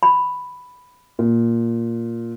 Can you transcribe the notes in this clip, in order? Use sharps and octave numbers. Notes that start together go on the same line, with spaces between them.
B5
A#2